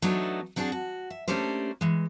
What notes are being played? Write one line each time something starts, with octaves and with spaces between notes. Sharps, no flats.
F#3 A3 B3 D4 D#4
F#3 C4 D4 D#4 F#4 G#4
F#4
E5
A3 A#3 C#4 D4 G4 C5
E3 G#3